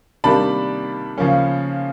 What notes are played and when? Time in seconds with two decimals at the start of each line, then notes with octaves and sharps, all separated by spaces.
0.24 C3 D#3 G3 A#3 D4 A5 B5
1.18 C#3 F3 A#3 C#4